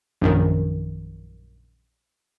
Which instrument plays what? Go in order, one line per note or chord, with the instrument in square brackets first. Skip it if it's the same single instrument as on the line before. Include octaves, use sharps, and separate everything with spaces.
[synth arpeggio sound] A#1 F#2 D#3